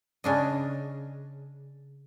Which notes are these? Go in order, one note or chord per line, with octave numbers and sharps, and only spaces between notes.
C#3 D4 D#5